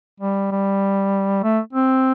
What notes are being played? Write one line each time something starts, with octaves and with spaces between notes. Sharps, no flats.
G3
G3
A3
C4